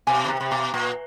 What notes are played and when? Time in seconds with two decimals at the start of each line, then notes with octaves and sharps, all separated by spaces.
0.07 B2 G#5
0.17 A5
0.24 C#3
0.28 C3 A#5
0.40 C3 B5
0.51 B2 A#5
0.74 A#2